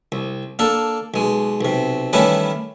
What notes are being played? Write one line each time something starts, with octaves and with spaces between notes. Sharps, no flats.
C2
A#3 D4 A4
B1 G#3
B1 C3
D#3 E3 G3 A3 C#4 B4